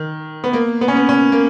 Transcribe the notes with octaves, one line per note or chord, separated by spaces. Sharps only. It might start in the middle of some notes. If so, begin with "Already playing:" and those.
Already playing: D#3
B3
A#3
B3
C#4
B3
C#4
A#3